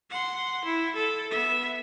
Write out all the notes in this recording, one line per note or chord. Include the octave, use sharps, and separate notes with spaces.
F#5 C6
E4
A4
B3 E5